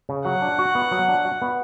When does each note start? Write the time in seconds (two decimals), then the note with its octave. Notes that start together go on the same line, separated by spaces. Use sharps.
0.09 C#3
0.25 F#3 F#5
0.42 D4
0.58 F#4
0.75 B3
0.91 F#3
1.08 D4
1.25 F#4
1.42 B3